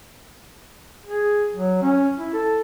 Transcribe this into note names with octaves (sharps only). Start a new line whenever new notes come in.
G#4
F#3
C#4
E4
A4